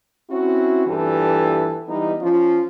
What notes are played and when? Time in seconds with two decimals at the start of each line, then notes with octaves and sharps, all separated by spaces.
0.28 C4 C#4 E4 F#4
0.86 G2 A#2 E3 G4 A4
1.86 E3 G3 B3 D#4
2.20 F3 C#4 F4